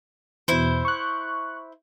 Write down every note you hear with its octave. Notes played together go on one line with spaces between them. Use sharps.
E2 B2 E4 C5
C#6 F#6